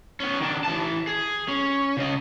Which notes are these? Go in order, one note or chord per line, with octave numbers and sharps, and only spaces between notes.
B3 C#4
D#3 D4
E3 A5
G#4
C#4
C#3 D#5